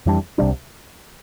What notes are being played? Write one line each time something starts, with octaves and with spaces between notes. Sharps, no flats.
F2 E3 G3 D4
C2 C3 G3 D4